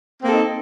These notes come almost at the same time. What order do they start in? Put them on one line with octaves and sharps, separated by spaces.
C4 A#3 A4 D#4